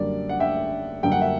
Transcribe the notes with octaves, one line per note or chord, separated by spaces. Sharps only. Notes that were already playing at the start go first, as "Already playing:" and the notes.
Already playing: F#2 D3 G3 A#3 D5
F#5
E5 G5
F#2 D3 G3 A#3 G5
F#5
E5